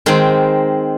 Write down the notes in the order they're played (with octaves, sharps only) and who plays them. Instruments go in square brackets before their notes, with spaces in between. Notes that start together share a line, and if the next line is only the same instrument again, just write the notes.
[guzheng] D#3 G#3 C4